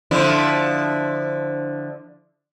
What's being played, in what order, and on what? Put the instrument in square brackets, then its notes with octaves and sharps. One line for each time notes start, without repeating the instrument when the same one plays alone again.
[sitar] D3 F3 E4